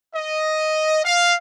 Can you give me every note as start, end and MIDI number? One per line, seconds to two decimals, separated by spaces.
0.14 1.02 75
1.05 1.35 77